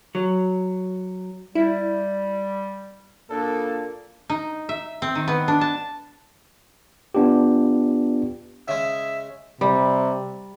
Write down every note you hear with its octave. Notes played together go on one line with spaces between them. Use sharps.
F#3
G3 E4
A#2 A#3 D4 A4
D#4
E5
C4
D#3
B3
D4
A5
B3 D4 F4 G4
C#3 G#3 E5
C3 G3